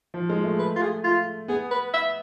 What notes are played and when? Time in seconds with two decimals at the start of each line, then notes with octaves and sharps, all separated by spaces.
0.14 F3
0.30 G#3
0.44 A3
0.59 B4
0.76 F4
0.82 G#4
1.04 F4
1.48 B3 G#4
1.71 B4
1.94 E5